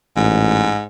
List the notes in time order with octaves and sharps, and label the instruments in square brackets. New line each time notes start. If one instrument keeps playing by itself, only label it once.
[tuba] A1 [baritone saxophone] G#2